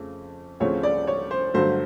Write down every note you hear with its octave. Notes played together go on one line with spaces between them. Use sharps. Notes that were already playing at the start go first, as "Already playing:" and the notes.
Already playing: F2 C#3 F3 A3
D2 C#3 F3 A3 C4 C#5
D5
C#5
C5
G2 D3 F#3 A3 C5